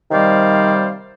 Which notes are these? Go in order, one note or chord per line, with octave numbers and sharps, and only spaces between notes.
C3 D#3 G3 C5 D5 F5